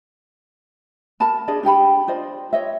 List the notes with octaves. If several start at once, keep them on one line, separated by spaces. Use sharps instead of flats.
A#4 E5 A5 B5
D4 G#4 D5 D#5
D4 G4 G5 B5
F4 C5 D5 D#5
C#5 D#5 E5